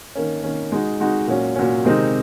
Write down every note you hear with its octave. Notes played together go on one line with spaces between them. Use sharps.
D#3 A#3 C#4
D#3 A#3 C#4
G#3 D#4 F#4
G#3 D#4 F#4
A#2 F#3 C#4
A#2 F#3 C#4
C3 D#3 G#3 C4 D#4